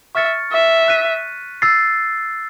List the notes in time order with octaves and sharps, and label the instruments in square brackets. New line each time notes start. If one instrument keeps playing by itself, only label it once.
[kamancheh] E5 [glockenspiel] C#6 F6 A6 C#7
[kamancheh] E5
[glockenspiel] F#6 B6 D#7
E6 A6 C7